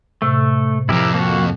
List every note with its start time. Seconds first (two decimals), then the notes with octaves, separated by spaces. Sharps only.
0.22 A2 C3 A3
0.89 F2 G#2 E4 G4 A#4
1.14 A#3 F#4